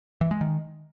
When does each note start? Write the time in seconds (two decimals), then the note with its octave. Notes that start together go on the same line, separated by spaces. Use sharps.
0.21 E3
0.31 G#3
0.41 D#3